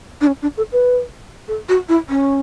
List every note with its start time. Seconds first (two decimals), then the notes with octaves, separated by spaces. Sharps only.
0.21 D4
0.27 C#4
0.42 D4
0.57 A4
0.72 B4
1.48 A4
1.69 F#4
1.89 E4
2.09 C#4